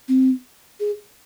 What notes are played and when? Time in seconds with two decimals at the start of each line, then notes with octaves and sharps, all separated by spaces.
0.08 C4
0.80 G#4